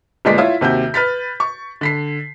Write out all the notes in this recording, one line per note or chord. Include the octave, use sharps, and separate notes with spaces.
G1 A#2 G#3 D5 B6
E4 F4 C#5 E5
D#2 C3 F#4 G6
B4 F6 A6 B6
C#6
D3 B6 C7